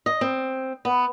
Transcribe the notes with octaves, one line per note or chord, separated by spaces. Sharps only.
D#5
C4
B3